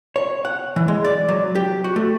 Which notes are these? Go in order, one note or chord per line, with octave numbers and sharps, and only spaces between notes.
C#5
F#5
E3
G#3
D5
F#3
G4
F#4
A3